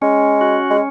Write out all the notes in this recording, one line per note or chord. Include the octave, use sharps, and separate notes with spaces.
G#3 C#4
F#4
G#3